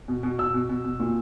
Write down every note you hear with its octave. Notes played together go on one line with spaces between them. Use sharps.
B2
B2
B2 E6
B2
B2
B2
A#2